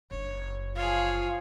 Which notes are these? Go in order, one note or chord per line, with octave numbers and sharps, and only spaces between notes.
F#1 D4 C#5
F3 F4 G#4 C#5 F5